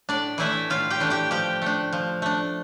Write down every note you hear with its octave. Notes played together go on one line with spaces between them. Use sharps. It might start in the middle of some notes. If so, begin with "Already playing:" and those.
A2 D4 D5
E3 A3 D4 E4 E5
A2 F4 F5
G4 G5
E3 A3 D4
G4 G5
F3 G4 G5
A3 D4
F3
A3 D4